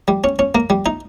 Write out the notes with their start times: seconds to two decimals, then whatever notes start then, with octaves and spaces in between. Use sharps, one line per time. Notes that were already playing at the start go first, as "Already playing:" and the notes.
0.08 G3
0.24 C#4
0.39 C#4
0.55 A#3
0.70 G3
0.86 D#4